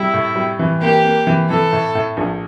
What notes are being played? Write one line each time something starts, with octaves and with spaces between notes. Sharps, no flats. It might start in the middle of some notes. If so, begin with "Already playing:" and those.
Already playing: G3 E4
A2
G3
E3
A#3 G4
A#3
E3
E3 A4
A2
A2
A#1